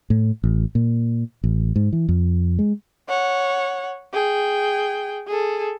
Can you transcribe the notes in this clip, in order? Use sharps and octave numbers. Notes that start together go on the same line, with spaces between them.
A2
A1
A#2
A1
G#2
E3
F2
G#3
C#5 F#5
G#4 G5
G#4 A4